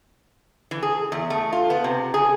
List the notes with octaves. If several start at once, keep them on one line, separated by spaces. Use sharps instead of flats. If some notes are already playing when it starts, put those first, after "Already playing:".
E3
G#4
E2
A3
F4
B3
C3
G#4